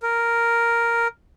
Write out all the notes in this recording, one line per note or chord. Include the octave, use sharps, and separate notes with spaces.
A#4